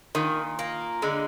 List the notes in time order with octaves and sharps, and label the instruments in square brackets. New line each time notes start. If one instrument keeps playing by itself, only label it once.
[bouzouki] A#2 [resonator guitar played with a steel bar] D#3
[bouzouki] A#3
[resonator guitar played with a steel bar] D3 [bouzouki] G#3